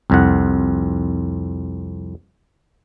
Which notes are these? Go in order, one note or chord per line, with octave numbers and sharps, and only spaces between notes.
C2 F2 F#5